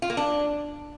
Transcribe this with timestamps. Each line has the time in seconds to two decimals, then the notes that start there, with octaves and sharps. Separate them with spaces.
0.02 F4
0.10 A#3
0.17 D4